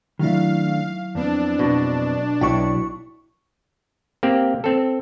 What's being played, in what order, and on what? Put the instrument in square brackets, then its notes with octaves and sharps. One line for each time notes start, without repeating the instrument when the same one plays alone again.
[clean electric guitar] D#3 A3 D4 [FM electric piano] F#3 E4 [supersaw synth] F5
[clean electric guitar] F2 B3 C4 [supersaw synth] D4
[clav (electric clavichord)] B2
[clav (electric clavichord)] B1 D5 [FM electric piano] E4 C#6 [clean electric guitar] F#4 G5
[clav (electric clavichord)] A#3 C4 G4
C4 A4